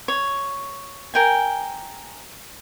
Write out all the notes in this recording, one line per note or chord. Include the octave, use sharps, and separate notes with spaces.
C#5
A#4 G5 G#5